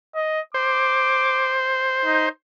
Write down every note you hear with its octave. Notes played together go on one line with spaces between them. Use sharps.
D#5
C5 D6
D#4